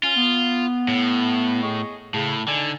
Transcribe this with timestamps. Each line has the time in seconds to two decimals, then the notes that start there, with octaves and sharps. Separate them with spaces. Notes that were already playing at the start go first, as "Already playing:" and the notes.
0.03 C#4 F4
0.17 B3
0.88 A2
1.63 G#4 D#5 C#6
2.14 A2 C#3
2.48 D3 D#4 D5 G#5